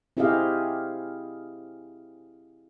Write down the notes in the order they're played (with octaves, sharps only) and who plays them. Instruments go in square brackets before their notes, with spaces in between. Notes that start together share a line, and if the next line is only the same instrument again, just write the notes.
[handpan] C4 E4 G4 G#4 D#5 F5